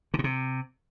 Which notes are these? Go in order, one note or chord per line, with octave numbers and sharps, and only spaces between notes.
D3
A#2
C3